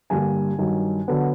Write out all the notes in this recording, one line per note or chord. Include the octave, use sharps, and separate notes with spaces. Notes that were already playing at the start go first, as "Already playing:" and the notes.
G2 D3 G3 A#3 G#5
G2 D#3 F#3
D3 F#3 B3